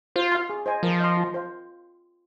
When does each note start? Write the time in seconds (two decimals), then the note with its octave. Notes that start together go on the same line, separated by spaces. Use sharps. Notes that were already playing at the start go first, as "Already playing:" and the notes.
0.16 F4 C5
0.32 F5 C6
0.50 G#4
0.66 C5 D#5 G#5
0.83 F3 A#4
1.00 D#5 C6
1.17 F4
1.34 C5 F5